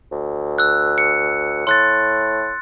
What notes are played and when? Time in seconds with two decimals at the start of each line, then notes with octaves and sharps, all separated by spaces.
0.12 D2
0.58 E6 F#6
0.98 C#7
1.67 A2 C6 F#6 A6